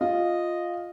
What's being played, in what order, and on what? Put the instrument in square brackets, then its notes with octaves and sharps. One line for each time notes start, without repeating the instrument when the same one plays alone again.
[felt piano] F4 [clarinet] D#5